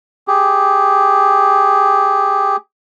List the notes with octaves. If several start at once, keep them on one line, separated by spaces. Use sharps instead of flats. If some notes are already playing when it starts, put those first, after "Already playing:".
G4 G#4